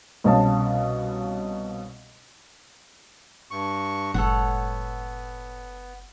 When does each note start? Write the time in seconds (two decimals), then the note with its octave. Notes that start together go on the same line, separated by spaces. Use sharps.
0.24 C2 B2 C#4 F5 A5
3.51 G2 C#6
4.14 F#1 A2 F#3 G#3 B3 A4 C#5 F#5